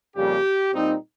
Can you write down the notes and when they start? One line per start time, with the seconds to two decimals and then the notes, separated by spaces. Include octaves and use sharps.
0.17 F2 C#3 G3 A#3 G4
0.74 A#2 G3 C4 D#4